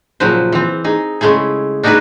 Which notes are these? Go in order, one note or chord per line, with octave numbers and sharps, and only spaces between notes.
A#2 C#3 F3 F#3 B4 C5
E3 C4
D#4 G#4
C#3 G#3 A3 E4 G#4
D4 D#4 F#4 G#4 A4 B4